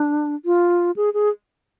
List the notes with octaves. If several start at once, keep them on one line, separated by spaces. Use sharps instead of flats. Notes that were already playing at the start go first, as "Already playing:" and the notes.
Already playing: D4
F4
G#4
G#4